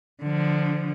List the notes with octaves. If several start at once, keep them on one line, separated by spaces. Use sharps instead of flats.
D3 F3